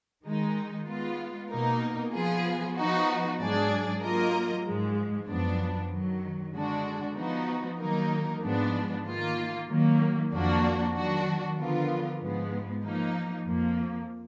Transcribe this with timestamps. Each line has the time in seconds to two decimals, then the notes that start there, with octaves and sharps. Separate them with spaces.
0.25 D#3 G#3 D#4
0.87 G#3 B3 F4
1.50 B2 A#3 D#4 A#4
2.13 F3 B3 F4 G#4
2.76 F3 B3 D#4 F#4
3.39 G#2 F#3 D4 G#4 D5
4.02 F#3 A#3 F4 A#4 D#5
4.64 G#2 F3 G#3
5.28 F#2 F3 B3 D4
5.91 F#2 D#3 F#3
6.54 D3 G#3 D4 F#4
7.16 F3 B3 D#4 F#4
7.79 D#3 F#3 A#3 D#4 A#4
8.43 G#2 F3 G#3 B3 D4
9.05 D#3 A#3 F4
9.68 D#3 F#3 A#3
10.31 F2 F3 A#3 D4 F#4
10.94 D#3 F#3 D4 F#4
11.57 D3 F3 B3 F4 A#4
12.20 G#2 F3 G#3 B3
12.83 F3 A#3 D#4
13.45 F2 F3 A#3